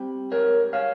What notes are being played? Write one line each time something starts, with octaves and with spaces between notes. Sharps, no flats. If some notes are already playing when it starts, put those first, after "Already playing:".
Already playing: G3 C4
G#2 A#4 C#5
C#5 F5